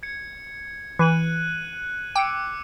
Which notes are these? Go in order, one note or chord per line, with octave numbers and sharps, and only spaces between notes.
G#6 C#7
E3 F#6 D#7 F#7
G5 D6 E6 C#7